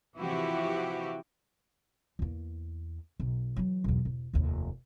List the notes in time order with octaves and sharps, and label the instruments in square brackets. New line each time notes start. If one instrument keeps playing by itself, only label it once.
[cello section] C3 E3 F3 E4 F#4 G4
[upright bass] E2 A#3
B1
E3 F#3
B1 E2
E1
F1 D#2